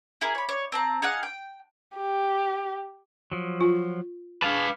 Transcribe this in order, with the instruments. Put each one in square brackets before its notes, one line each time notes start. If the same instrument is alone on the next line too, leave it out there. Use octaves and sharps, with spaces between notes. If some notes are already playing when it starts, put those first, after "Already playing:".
[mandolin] E4 G#4 A#4
C#5 B5
C#5
C4 A5 A#5
D#4 G#4 F5 F#5
G5
[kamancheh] G4
[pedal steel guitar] F3 F#3
[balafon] F4
[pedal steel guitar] G#4 A5 [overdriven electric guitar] B4 F5